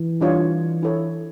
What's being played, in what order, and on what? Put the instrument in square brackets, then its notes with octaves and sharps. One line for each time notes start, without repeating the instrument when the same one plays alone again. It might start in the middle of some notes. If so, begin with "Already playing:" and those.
Already playing: [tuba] E3
[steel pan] G3 D4 F4 C#5
E4 A4 C#5